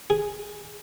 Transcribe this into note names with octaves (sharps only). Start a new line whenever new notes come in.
G#4